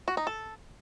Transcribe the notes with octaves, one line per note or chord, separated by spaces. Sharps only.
F#4
D#4
A4